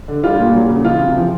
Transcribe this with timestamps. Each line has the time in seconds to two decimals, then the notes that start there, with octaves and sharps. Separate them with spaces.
0.08 D3
0.24 G3 F4
0.39 A#2
0.55 F#3
0.69 C#3
0.85 E3 F4
1.01 C3
1.16 F3